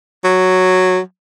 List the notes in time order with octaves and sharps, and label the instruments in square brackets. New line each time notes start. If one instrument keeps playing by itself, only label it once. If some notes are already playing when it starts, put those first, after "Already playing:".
[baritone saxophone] F#3